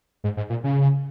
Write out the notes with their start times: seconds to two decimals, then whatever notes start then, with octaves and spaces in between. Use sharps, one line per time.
0.24 G#2
0.37 G#2
0.50 A#2
0.64 C#3